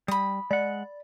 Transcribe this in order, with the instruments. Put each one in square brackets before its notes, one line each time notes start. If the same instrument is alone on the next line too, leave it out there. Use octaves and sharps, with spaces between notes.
[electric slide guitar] G3 [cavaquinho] B5 D#6
[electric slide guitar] G#3 F#5 [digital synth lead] D5